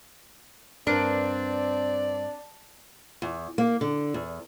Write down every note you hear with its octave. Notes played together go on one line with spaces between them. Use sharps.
G2 C4 D4 A#4 B4 D5
E2
A#3
D3
E2